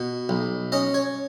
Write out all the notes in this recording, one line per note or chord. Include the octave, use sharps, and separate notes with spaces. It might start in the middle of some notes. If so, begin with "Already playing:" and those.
Already playing: B2
B1
C#4 D#5
C#5